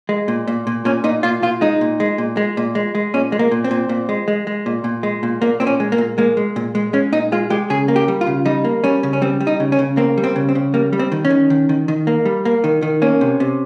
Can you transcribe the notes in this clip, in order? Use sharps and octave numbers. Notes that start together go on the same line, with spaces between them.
G#3
A#2
A#2
A#2
A#2 C#4
A#2 D#4
A#2 F4
A#2 F4
G#3 D#4
A#2
G#3
A#2
G#3
A#2
G#3
G#3
A#2 C#4
G#3
A#3
A#2
C4
A#2
A#2
G#3
G#3
G#3
A#2
A#2
G#3
A#2
A#2 A#3
A#2 C4
C#4
G#3
A#3
A#2
G#3 A#3
G#3
A#2
G#3
G#3 C#4
A#2 D#4
G#3 F4
G#3 G4
C#3 G#4
A#3
G4
G3
F4
C#3
G3 D#4
A#3
G3 C#4
C#3
C#4
G3 C4
G3
D#4
C#3
C#4
C#3
A#3 C4
G3
C4
C#3
C4
C#3
G3 A#3
G3
C4
D#3
C#4
D#3
D#3
D#3
D#3
A#3
G3
A#3
D#3
D#3
A#3 C#4
C3
C3